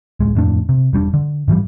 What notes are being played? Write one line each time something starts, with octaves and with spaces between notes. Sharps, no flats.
D1 G#3
D1 F2 A2 D4
C3
E1 G3 C#4 D4
D3
G#2 E3 F3 G3